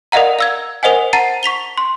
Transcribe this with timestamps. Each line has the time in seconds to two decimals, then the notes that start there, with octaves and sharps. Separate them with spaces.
0.12 A#4 D5 D#5 F5 F#5 A#5
0.39 F5 E6 G#6
0.83 A#4 C5 D#5 F#5 G#5
1.13 F#5 A5 A#5 A6 C7 D#7
1.43 C#6 B6 F7 G7
1.78 C6